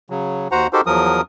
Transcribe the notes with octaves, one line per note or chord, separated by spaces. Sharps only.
C#3 F#3
D#2 F#4 C5 F#5 A#5
D#4 F#4 G4 A4 A#4 C5
E2 F3 F#3 A#4 D#6